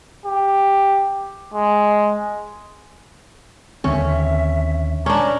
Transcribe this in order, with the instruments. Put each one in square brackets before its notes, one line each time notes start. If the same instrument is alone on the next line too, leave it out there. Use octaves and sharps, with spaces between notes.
[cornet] G4
G#3
[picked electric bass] D#2 C4 [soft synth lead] D3 [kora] C#4 [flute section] E5
[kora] C#4 D4 [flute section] A#5 D6